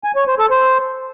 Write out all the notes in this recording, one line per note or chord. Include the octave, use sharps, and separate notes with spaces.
G#5
C#5
C5
A4
C5